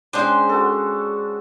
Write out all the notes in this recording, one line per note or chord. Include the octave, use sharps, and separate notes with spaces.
G#3 C#4 D4 C5 G5
F#4 A4